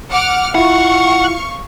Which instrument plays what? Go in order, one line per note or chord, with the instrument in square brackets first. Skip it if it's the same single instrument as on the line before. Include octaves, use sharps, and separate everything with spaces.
[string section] F#5 D6 F6
[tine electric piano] E4 F4 [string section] F5 C#6 [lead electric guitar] F#5